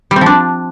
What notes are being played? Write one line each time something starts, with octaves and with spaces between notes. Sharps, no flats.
G3
C4
F3
D4